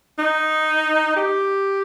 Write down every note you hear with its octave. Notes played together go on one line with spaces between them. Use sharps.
D#4
G4